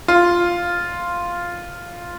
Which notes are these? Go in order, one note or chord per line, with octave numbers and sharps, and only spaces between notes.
F4